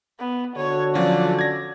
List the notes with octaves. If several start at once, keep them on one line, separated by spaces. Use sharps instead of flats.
B3
D3 F#4 A4 C#5
F3 F#3 C#4 D5
G#6 A#6